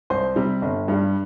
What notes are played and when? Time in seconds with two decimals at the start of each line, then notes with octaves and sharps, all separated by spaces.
0.10 C2 C5
0.36 C3 G3
0.62 G1
0.88 G2 G3